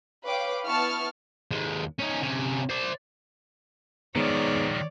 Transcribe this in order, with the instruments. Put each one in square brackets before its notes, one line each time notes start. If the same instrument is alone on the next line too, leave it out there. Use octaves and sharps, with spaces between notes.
[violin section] B4 C#5 F5 G5 D6
B3 E4 A5 C#6 F6
[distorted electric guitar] D#2 G#3
C#4 D#4
C3 C#4
C5 D5
[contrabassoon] G#2 [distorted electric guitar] D#3 F3 [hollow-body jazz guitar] B3 [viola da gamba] C#5 D5